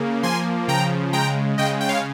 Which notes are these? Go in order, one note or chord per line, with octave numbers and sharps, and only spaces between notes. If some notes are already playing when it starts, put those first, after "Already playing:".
Already playing: C#3 A#3
F3 G#5 C6
C#3 G5 A#5
G#3 G5 A#5
C#3 D#5 G5
G5
C#5 F5